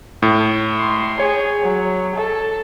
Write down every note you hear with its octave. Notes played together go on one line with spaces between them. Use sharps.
A2
C6
G#4 C#5
F#3
A4